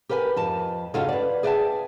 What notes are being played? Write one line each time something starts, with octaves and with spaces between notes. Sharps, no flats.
G4 A#4 B4 G5 G#5
F2 A5
C#3 C#4 D#4 F4 F#4 A4
B4 D5
G#4 D5 E5 F#5 G5 A5